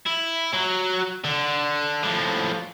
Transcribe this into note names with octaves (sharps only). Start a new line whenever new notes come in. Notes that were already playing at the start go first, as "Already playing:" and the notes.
E4
F#3
D3
A2 F3